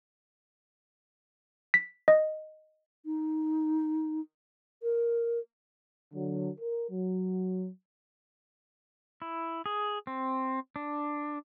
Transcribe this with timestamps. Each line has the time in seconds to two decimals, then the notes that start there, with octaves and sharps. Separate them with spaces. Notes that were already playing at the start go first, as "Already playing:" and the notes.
1.74 B6
2.08 D#5
3.05 D#4
4.83 A#4
6.14 D3 F#3
6.60 A#4
6.91 F#3
9.22 E4
9.66 G#4
10.07 C4
10.76 D4